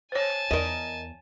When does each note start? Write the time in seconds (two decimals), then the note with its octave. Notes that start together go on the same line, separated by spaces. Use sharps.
0.12 C5 C#5 G#5 A5
0.51 E2 A#4 D#5